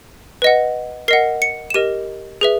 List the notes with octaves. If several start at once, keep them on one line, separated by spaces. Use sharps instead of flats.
B4 D#5 F#5
A#4 D#5 F#5 C7
C#7
E7
G4 A#4 D#5 D#7
G#4 B4 E5